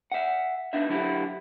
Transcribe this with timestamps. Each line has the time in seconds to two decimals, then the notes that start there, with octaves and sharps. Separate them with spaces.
0.12 E5 F#5
0.73 B3 D4 D#4 E5
0.89 D3 F#3 E4 F#4 G4